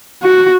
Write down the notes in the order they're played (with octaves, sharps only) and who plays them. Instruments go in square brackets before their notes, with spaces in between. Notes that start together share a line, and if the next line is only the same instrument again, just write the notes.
[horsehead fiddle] F#4